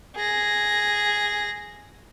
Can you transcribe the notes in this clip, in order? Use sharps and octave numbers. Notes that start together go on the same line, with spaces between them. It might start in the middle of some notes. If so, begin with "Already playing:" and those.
G#4 A#6